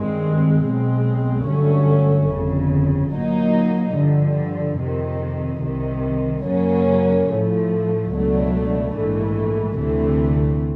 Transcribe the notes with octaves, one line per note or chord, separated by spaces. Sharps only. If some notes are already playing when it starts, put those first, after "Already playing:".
Already playing: G2 D#3 G#3 C4
B1 B2 G#3 C4
G2 D3 F#3 A3 C#4
G1 F2 C#3
A#2 F#3 A#3 D#4
G2 D3 F3
F2 C3 D#3
C2 C3 D#3
F#2 C#3 F#3 A#3 C#4
A2 F3 A3
C#2 B2 F#3 A3 D4
A#1 G#2 E3 A3
D2 C3 E3 A3